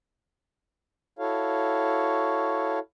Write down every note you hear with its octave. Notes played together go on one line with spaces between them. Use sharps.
E4 F#4 A4 C#5 F5